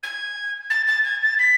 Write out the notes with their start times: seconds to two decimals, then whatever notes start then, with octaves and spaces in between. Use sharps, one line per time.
0.03 G#6
0.70 A6
0.87 A6
1.04 G#6
1.22 A6
1.39 B6